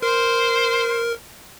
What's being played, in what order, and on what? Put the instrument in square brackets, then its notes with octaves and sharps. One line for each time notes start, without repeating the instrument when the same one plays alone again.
[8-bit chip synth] A#4 [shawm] C5